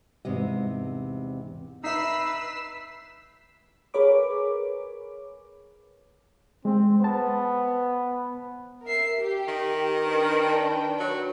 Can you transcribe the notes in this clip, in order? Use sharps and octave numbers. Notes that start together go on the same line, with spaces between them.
E2 G#2 C3 D#5
D#4 B4 E5 E6 B6 C7 E7
G#4 A#4 B4 C#5 B5 D6
G#3 C4
B3 C5 A5
A#4 E5 C7
G4
D#3
D4 B4 G5
F#3